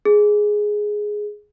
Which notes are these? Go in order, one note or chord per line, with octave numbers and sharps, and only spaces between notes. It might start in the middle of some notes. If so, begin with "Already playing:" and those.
G#4